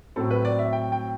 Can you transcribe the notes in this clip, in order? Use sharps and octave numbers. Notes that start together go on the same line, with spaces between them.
A2 F#3 C4 A4
B4
D5
E5
G5
G5